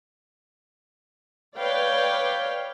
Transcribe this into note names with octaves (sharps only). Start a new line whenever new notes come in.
B4 C#5 D5 F5 G5